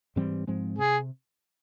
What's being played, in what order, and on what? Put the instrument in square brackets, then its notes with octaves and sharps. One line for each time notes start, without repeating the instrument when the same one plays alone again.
[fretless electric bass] G#2 E3 G3 C4
G#2 F3 G#3 C4
[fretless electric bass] C3 [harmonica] G#4